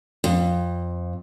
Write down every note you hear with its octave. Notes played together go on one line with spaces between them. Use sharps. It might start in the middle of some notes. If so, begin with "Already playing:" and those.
F2